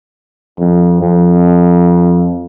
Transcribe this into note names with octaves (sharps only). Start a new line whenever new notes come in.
F2
F2